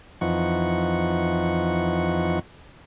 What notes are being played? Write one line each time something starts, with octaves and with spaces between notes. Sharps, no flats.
F2 E3 F3 D#4 F#5 C#6